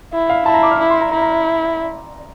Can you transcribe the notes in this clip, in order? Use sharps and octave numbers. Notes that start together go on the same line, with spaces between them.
E4
F5
E4 A5
A#5
D6
F6
E4 D6
C6
A#5
E4 A#5
A#5